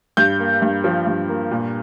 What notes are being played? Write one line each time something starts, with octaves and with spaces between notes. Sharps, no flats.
G2 G6
A#3
G2
F3
G2
A#3
A#2